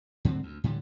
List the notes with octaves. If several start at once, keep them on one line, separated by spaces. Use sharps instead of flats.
G#2 D3 F#3 C4
D2
A2 D3 E3 G3